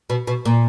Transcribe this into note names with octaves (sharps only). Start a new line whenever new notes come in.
B2
B2
A#2